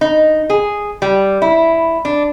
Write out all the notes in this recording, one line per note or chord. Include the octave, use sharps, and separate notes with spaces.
D#4
G#4
G3
E4
D4